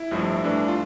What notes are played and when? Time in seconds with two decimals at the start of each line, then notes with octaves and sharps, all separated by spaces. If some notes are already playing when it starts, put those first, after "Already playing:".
Already playing: E4
0.11 A1 G2 F3 A3
0.43 G2 E3 A3 D4
0.68 F4